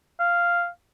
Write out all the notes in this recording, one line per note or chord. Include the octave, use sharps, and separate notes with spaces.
F5